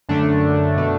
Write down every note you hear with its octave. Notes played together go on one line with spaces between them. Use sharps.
F#2 D3 A3 D4
B2 A3